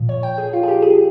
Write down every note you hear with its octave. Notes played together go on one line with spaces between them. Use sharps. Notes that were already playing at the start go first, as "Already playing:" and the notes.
Already playing: A#2 F3
C#5
G5
G#4
F4
G#4
G4
G#4